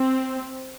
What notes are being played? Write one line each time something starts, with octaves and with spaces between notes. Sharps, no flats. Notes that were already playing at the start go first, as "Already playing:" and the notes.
Already playing: C4